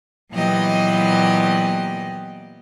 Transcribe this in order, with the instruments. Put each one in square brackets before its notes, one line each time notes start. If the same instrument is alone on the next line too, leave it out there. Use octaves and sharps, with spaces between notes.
[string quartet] A#2 E3 F#3 B3 G4 D#5